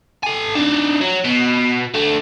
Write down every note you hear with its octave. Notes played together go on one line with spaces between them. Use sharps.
A4 G#5
D4 D#4
F#3
B2
D3 A3